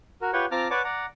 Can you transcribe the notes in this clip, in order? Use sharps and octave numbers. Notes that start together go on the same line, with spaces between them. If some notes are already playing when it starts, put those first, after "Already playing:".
F#4 A#4
F4 G4 B4 C#5 F#5 G5
C4 F4 A5 A#5 D6 F6
B4 C#5 D5 F#5 A5 D6
D5 F#5 A#5